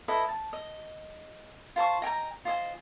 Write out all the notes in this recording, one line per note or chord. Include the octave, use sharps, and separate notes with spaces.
E4 A4 B4 D#5
A5
D#5
F4 C5 A5 C#6
D#5 G5 G#5 A#5
F4 C5 D#5 G#5